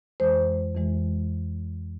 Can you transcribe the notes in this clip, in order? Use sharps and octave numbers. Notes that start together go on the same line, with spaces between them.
F2 E3 G#3 C5
F2 E3 G#3